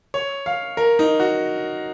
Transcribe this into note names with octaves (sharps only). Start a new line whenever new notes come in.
C#5
F5
A#4
D#4
F#4